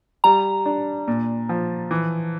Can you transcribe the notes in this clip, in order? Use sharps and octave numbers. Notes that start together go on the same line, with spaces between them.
G3 A#5
D4
A#2
F3
E3